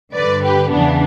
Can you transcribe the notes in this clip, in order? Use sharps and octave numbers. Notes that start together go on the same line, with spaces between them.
G2 D3 B4 D5
G4 B4
E2 C#3 E3 B3 D4